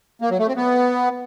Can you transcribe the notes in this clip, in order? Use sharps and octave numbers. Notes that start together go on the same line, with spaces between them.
A#3
F#3
A3
C4
B3